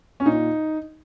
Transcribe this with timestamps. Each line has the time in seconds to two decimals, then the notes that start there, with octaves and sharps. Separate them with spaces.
0.20 C#4
0.25 A#2 D#4